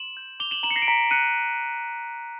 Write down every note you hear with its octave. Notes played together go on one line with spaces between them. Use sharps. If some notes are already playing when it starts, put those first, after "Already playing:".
Already playing: C6 E7 F#7
G6
D6 F7 G7
E7 F#7
A#5 E7 F#7
C#7
A#6 C7
D7
A#5 B6 C#7
F#6 C#7 D#7